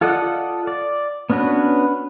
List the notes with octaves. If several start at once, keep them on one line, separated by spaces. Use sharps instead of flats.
F4 A4 D5 D#5 F#5
D5
B3 C#4 D4 F#4 B4